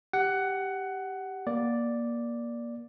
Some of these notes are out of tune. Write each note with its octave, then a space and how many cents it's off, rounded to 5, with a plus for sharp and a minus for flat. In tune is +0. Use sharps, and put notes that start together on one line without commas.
G4 +0 F#5 +15
A#3 +20 D5 +0